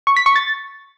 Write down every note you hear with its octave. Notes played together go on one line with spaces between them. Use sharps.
C#6
B6
C#6
A6